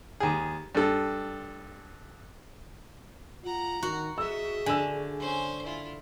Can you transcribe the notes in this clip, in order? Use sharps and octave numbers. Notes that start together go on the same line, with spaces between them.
D#2 G#4
G2 A4
F4 F#5 A#5
D#3 F#4
G#4 D#5 E5 E6
D3 G#5 E6
C#4 C5
E4 F4